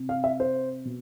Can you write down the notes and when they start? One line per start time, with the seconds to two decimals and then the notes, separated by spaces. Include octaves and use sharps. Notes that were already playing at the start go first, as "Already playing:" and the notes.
Already playing: C3
0.09 F5
0.24 E5
0.40 C5
0.85 B2